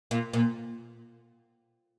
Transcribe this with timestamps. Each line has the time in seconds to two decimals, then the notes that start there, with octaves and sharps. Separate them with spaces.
0.11 A#2
0.33 A#2